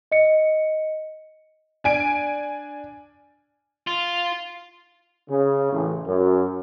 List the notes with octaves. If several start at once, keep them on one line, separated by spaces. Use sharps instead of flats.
D#5 C#7
D4 G#5 D7
F4
C#3
A1
F#2